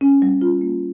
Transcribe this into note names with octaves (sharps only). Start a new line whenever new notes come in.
C#4
G3
F4
A#3